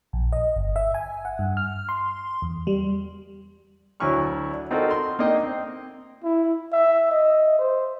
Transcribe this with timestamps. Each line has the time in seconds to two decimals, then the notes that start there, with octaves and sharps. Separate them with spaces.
0.13 A#1
0.32 D#5
0.56 G1
0.76 E5
0.94 G#5
1.25 F#5
1.39 G2
1.57 F6
1.89 C6
2.42 E2
2.67 G3
4.00 D2 F#3 E4 G#5 C#6 F6
4.51 D4
4.71 C4 D#4 F4 F#4 A4 A#4
4.91 C6
5.19 A#3 D4 D#4 D#5 G5
5.43 C4
6.24 E4
6.73 E5
7.11 D#5
7.59 C5